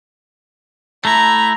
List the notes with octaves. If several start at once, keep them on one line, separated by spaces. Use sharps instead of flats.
A3 E4 A#5